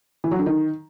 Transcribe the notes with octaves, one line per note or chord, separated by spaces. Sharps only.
E3
F#3
D3
D#3